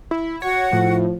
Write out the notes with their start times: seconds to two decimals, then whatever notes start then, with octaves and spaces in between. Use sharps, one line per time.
0.11 E4
0.42 F#4 C#5 F#5
0.72 A2 F3